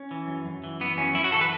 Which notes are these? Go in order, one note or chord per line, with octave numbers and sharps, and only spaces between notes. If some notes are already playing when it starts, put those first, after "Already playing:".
Already playing: C#4
E3
F#2
F#2
E3
E3 B3
F#2 C#4
F#2 E4
F#4
E3 A4
B4